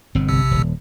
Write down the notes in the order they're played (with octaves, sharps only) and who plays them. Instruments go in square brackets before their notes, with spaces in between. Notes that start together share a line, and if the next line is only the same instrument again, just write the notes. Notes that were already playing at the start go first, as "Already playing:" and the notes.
[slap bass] G1 B2 C4
[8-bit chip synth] A#1 C3 E6
[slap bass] D#1